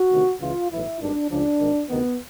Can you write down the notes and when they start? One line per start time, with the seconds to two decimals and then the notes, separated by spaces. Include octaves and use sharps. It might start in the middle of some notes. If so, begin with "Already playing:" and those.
Already playing: F#4
0.10 D2 C3 D#3
0.40 C#2 C#3 E3 F4
0.70 B1 A2 E3 E4
1.00 G#1 G2 D#3 D4
1.30 C#2 C#3 F3 D4
1.59 G#1 G#2 D#3
1.89 D2 C3 D#3 B3